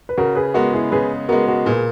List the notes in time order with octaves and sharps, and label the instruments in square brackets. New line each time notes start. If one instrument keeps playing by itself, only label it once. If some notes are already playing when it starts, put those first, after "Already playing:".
[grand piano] B4
[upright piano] C#3 [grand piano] F#4 A#4
[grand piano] G#4 B4
[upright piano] G#3 B3 [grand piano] F#4 A#4
[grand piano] E4 G#4
[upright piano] C#3 [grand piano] G#4 B4
[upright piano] G#3 B3 [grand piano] F#4 A#4
[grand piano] F#4 A#4
[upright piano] A#2 [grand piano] G#4 B4